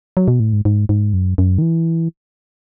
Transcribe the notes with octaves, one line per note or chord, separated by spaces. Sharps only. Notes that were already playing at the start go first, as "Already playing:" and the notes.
F#3
B2
A2
G#2
G#2
G#2
F#2
F#2
D#3
E3